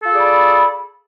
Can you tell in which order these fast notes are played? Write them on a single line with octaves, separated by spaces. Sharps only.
A4 F4 G#4 D5 B5